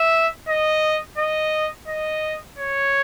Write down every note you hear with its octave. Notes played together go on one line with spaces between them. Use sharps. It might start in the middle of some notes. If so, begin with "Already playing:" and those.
Already playing: E5
D#5
D#5
D#5
C#5